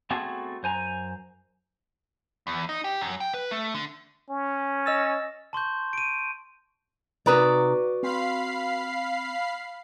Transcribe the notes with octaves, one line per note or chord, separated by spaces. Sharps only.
A3 B3 C4 F#4 G#4 A4
F#2 C5 G#5 A#5
E2
D#4
G4
F#2
G5
B4
A3
D3
C#4
D#5 E6 A6
A5 C6 C#6 G6
D7 D#7
C3 D#4 F#4 B4 D5 A#5
C4 F5 B5 C7